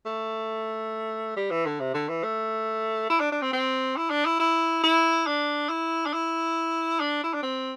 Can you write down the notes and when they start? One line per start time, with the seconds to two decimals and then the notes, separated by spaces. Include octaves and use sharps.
0.06 A3
1.36 G3
1.51 E3
1.66 D3
1.80 C3
1.94 D3
2.09 E3
2.24 A3
3.10 E4
3.20 D4
3.32 D4
3.42 C4
3.53 C4
3.97 E4
4.10 D4
4.26 E4
4.40 E4
4.83 E4
5.27 D4
5.69 E4
6.06 D4
6.13 E4
7.00 D4
7.24 E4
7.33 D4
7.43 C4